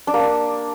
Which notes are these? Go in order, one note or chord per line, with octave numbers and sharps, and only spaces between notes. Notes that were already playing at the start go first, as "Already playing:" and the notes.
D4
A#3
D4